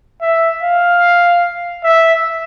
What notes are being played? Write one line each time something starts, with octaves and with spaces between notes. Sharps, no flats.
E5
F5
E5